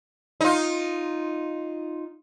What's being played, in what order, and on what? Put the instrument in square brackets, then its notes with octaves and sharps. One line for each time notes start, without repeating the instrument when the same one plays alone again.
[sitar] D#4 F4